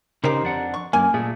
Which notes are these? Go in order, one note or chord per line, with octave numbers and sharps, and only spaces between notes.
C#3 D#4 G4 A#4 C5
F2 D4 F#5
C#6
F#2 A#3 G#5
A#2 A3 G#4